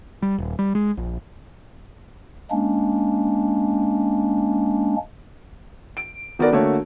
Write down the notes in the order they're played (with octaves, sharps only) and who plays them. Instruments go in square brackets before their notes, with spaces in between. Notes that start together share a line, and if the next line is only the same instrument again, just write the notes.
[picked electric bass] G3
D#1
G3
G#3
A#1
[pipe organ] G#3 A#3 C#4 D4
[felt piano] D7
D#3 B3 F#4 A4 A#4 D5
D3 A3 A#3 F#4 C#5